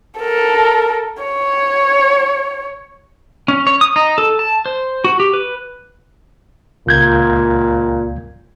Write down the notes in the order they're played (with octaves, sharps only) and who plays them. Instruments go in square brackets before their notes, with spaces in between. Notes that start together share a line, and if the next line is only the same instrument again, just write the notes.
[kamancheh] A4 A#4
C#5
[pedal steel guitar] C#4
C#5
D#6
D#4
A4
A5
C5
F#4
G4
B4
[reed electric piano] C#2 G6 G#6 [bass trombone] A#2